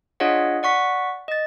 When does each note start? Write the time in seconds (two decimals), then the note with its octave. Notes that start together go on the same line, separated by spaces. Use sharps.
0.20 D4 F4 G#4 C#5 D#5 F#5
0.63 D5 F#5 C#6 B6
1.28 D#5 A6